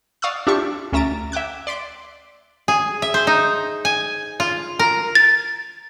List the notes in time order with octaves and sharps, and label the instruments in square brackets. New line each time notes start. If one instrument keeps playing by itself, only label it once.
[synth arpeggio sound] D5 F5 C#6 D#6 E6 F#6
D4 E4 F4 G4 E5 C#6
D2 C#4 E5 A#5 A6 D7
E5 G5 D6 F#6 G#6
D5 C6 B6 D7
[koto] G#4
E5
C5
D#4
G#5
F4
A#4
[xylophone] A6